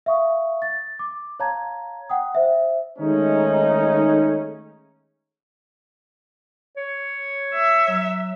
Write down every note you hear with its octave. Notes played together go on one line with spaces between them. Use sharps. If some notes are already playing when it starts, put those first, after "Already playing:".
E5 F5 C#6 D#6
A6
D6
C#5 F5 A5 A#5 G#6
F#5 G5 D#6
C5 E5
D#3 G#3 A3 C#4 D#4
C#5
E5
F#3